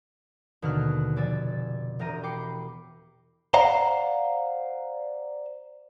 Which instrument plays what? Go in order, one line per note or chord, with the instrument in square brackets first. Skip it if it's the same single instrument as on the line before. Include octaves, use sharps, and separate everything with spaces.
[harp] D#2 B2 D3 D4 F6 F#6
F1 D5 G#5 E6 A6
E1 G4 A#4 A#5 D#7
G5 B5 D6 C7 C#7
[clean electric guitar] C5 D5 F5 F#5 A#5